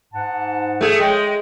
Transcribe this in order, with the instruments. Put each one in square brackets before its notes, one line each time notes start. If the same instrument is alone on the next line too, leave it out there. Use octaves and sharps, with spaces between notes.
[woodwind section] G#2 F#5 A5
[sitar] A3 G#4
[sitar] G#3 [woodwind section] C#5 G5